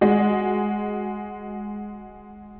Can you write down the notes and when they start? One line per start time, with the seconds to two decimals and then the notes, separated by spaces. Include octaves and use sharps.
0.01 G#3 F#4